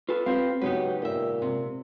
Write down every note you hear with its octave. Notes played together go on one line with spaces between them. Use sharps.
F4 A4 B4
C4 F4 G4 C5 F5
G#2 C#3 F#3 B3 D#4 G4 B4
A#2 D#5 E5
C3